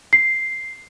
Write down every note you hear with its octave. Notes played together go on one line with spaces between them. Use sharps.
C7